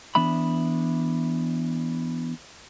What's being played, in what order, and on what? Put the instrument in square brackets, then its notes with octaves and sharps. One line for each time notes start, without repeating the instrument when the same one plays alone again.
[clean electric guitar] E3 B3 D4 E5 B5